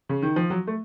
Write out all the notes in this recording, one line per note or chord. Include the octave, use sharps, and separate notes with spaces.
C#3
D#3
F3
F#3
A3